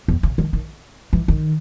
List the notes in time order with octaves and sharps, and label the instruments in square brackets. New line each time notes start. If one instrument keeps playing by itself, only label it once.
[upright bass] E2
C#3
D#3
D#3
E3
D#3